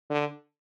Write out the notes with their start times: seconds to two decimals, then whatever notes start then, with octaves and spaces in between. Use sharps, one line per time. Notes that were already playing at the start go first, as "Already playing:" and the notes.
0.10 D3